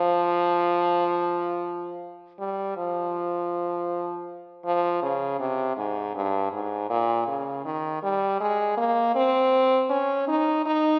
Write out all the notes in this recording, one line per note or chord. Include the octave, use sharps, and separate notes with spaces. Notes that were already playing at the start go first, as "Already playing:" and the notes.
Already playing: F3
G3
F3
F3
C#3
C3
G#2
G2
G#2
A#2
C#3
D#3
G3
G#3
A#3
C4
C#4
D#4
D#4